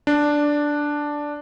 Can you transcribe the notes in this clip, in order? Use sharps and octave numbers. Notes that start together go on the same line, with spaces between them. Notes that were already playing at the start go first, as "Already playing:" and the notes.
D4